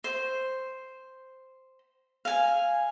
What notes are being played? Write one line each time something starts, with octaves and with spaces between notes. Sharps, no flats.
C5
F5 G#5